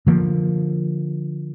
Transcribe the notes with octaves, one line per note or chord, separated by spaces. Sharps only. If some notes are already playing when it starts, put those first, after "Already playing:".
D3 F3 A#3